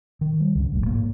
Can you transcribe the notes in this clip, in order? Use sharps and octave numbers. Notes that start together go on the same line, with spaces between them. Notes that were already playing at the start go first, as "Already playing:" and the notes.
D#3
G3
C#2 G2
F1 A#1 A2
G#2 A#3